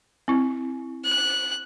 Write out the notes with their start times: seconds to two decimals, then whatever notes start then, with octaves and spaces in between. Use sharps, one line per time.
0.28 C4 E4
1.05 F#6